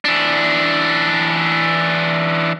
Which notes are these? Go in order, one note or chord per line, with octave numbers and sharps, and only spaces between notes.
E3 D4